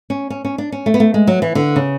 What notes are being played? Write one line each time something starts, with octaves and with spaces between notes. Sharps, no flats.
C#4
C#4
C#4
D4
C#4
A3
B3
A3
G#3
F#3
E3
D3
C#3